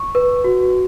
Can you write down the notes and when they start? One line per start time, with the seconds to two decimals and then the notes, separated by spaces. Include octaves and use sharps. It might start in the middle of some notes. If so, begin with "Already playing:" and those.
Already playing: C#6
0.15 B4
0.44 F#4